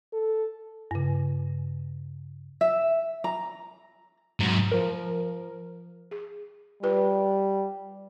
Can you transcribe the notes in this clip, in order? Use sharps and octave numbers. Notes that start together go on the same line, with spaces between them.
A4
G2 C#3
E5
A#5
G#2 F#3
F3 A#4
G#4
G3 F4 B4